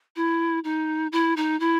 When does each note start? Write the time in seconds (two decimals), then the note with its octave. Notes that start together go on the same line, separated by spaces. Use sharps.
0.16 E4
0.64 D#4
1.12 E4
1.37 D#4
1.60 E4